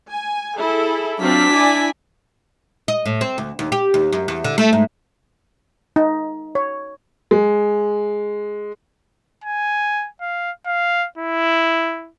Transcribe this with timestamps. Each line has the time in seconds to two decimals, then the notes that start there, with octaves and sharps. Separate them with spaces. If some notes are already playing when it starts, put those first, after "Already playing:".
0.10 G#5
0.58 E4 G#4 A4
1.22 F#3 C4 D4 F4 B6
1.54 E4 D5 G#5
2.88 D#5
3.06 A2
3.21 C4
3.38 D2
3.59 D#2
3.72 G4
3.94 D#2
4.12 F#2
4.28 E2
4.44 D3
4.58 A3
4.73 G#2
5.96 D#4
6.55 C#5
7.31 G#3
9.44 G#5
10.21 F5
10.66 F5
11.18 E4